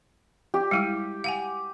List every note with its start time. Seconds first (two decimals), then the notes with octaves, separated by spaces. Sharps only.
0.54 G4
0.71 G3 G#3 E4
1.24 F5 F#5 G#5